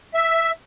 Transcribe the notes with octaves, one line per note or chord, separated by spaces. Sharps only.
E5